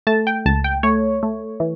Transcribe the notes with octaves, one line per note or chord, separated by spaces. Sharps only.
A3 A5
G5
C#2 A5
G5
A3 C#5
A3
E3